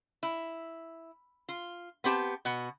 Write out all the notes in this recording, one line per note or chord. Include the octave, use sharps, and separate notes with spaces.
E4
F4
B3 C4 G4 A5
B2 F#5